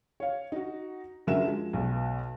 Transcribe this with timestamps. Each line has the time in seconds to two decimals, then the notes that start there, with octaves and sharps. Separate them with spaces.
0.20 C#5 F5
0.52 D#4 F#4
1.27 F#1 D3 F#3 A#4 E5 E7
1.45 F3 G#3
1.73 B1 B2